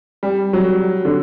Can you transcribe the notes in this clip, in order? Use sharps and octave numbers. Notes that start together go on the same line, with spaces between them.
G3
F#3
D3